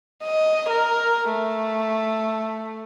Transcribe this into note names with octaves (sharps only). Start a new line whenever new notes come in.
D#5
A#4
A3